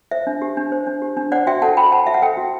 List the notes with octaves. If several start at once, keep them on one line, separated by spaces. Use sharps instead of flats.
C5 E5
D4
G4
D4
C5
D4
G4
D4
C5 D5 F#5
F#4 E5 G5
A4 F#5 A5
F#4 G5 B5
C5 F#5 A5
F#4 E5
F#5
A4 E5 G5
F#4